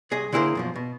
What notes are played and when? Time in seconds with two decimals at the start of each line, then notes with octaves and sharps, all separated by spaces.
0.11 C2 G#4 D#5
0.32 D3 A#3 E4 G#4 A#4 C5
0.55 F#2 B2 F3
0.76 B2